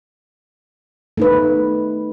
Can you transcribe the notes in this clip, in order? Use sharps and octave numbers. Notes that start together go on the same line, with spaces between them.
A3 D#4 B4